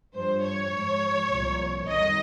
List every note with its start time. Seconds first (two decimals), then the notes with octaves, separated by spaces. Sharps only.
0.14 G2 F3 C5
0.43 C#5
0.72 G#2 F3
1.30 C2 A#2 F3
1.88 F2 D#3 G3 D#5